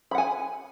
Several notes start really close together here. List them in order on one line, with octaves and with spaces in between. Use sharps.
B5 F#5 G#5